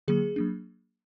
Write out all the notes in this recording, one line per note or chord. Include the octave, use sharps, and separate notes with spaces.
D3 F#3 A#3 G#4
F#3 A#3 D4